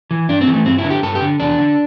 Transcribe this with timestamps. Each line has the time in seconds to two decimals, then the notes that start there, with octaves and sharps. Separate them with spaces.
0.11 E3
0.29 G2 D4
0.41 C4
0.48 E3
0.54 A3
0.66 G2 C4
0.78 E4
0.84 D3
0.90 G4
1.03 G2 A4
1.15 G4
1.21 D3
1.40 E2 D4
1.58 D3